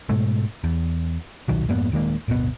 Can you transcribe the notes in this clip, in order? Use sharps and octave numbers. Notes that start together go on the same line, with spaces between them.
G#2 B2 G#3 A3
E2
D#1 B1 D#3 F#3
F2 G#2 A#3 B3
D#1 D#3 G#3 A#3
D1 G1 B2 B3